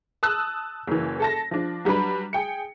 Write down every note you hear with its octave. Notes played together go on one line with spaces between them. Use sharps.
A5 D#6 E6 F#6
F#1 E3
A4 A5 A#6
F3 D4
F#3 G3 D4 B4
G#4 G5 C#7